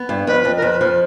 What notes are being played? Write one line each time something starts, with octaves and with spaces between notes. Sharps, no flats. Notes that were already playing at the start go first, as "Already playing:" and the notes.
Already playing: B3
G2
F2 B4
F2
A#4
F2 B4
F3